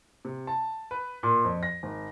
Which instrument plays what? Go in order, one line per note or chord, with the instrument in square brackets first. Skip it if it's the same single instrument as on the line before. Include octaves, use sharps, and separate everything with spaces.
[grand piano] C3
A5
B4
A#2
F2
A#6
G#1